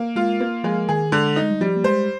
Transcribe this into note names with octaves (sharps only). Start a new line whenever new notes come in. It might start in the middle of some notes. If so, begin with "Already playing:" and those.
Already playing: A#3
G#3 F4
A#3
F3 G#3
D#3 G#4
D3 G#3
D#4
G#3
G3
F3 G3
A#3
G#3 C5